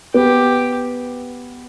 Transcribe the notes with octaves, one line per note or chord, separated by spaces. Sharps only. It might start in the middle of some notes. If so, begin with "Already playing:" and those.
B3 G4